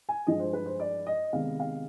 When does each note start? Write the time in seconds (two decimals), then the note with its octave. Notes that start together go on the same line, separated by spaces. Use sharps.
0.09 G#5
0.27 G2 F3 G#3 D#5
0.40 C5
0.53 B4
0.66 C5
0.80 D5
1.06 D#5
1.33 C3 D#3 G#3 B3 F5
1.60 F5